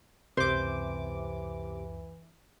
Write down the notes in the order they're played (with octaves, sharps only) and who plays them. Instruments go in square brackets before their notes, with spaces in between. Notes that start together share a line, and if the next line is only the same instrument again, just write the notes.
[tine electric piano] C#2 F#2 [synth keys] C3 D6 [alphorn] E3 [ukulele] C5